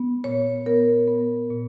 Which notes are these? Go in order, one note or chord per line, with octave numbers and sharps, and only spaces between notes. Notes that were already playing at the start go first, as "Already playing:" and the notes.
Already playing: B3
A#2 C#5
B3 A#4
B3
A#2